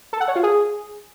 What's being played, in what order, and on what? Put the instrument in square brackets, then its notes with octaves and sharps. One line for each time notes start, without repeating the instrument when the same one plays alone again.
[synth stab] A4
F#5
C#5
F4
G#4